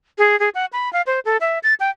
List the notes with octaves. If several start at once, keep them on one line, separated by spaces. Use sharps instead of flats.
G#4
G#4
F#5
B5
F5
C5
A4
E5
A6
G5